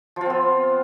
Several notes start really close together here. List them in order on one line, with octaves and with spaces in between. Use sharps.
F3 F4 C4 B3